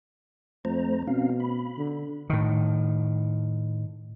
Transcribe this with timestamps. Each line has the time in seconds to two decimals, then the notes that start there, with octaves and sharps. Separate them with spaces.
0.65 F2 A3 C5 A#5
1.07 B2 C4 C#4 F5
1.40 B5
1.78 D3
2.30 A2 D#3